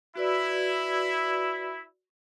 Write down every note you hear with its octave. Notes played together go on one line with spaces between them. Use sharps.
E4 F#4 B4 D5